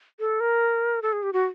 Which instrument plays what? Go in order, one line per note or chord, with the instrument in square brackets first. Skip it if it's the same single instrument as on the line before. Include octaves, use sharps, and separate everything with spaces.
[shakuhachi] A4
A#4
A4
G#4
G4
F#4